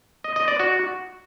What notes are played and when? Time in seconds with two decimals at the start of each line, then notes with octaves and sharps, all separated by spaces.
0.24 D#5
0.36 D#5
0.48 D5
0.60 F#4